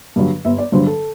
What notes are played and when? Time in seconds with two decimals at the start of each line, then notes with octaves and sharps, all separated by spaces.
0.16 G2 D3 F#3
0.45 G1 E5
0.58 D5
0.72 G2 D3 F#3 C5
0.87 A4